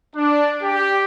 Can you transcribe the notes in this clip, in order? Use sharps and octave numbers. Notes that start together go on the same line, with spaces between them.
D4
G4